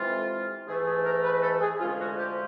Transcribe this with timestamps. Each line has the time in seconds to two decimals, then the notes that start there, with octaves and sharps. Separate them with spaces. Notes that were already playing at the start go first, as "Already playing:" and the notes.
Already playing: C3 E3 G#3 C4 F4
0.11 A4
0.67 G#2 E3 A3 G#4
0.85 G#4
1.04 A#4
1.24 B4
1.41 A4
1.61 G#4
1.79 D2 C3 F3 G#3 C#4 F4
1.98 F#4
2.17 G4